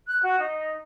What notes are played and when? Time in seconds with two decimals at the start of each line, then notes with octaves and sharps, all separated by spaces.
0.07 F#6
0.23 F#4
0.39 D#4